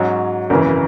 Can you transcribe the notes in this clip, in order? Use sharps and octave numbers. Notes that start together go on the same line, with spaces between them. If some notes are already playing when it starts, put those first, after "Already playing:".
Already playing: G#2 F#3 C#4
G#1 F#2 C#3 E3